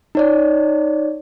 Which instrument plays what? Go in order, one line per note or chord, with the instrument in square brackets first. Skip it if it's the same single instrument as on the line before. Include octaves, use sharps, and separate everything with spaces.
[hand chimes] D#4 C#5 D5